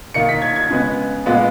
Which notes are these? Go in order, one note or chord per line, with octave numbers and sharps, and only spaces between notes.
D#3 A#3 C#7
B6
G#6
G#6
C#3 G#3 B3
A#2 G#3 B3